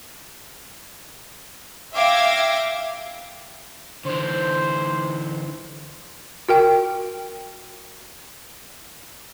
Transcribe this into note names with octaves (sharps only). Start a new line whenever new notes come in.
E5 F5 G5 D6 G#6 A#6
D3 E3 C5
F#4 A#4 G5